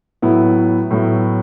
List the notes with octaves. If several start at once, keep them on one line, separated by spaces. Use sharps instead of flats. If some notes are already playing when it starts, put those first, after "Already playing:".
A2 F#3 B3 E4
A2 F#3 B3 E4